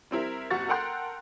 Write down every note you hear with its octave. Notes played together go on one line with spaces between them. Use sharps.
G3 C4 E4 A#4
F#1 C3 F#4 F#5 C#6 A6
A4 A#4 F#5 G5 C6 F#6